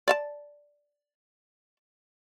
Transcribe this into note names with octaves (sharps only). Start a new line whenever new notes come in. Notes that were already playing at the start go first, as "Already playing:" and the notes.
D5 E5 A5